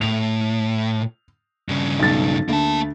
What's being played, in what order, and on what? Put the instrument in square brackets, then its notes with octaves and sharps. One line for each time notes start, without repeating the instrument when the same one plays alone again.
[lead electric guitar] A2 [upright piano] F7
[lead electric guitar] G2 C#3
[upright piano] B1 A6
[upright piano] D2 [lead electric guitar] A#3 A5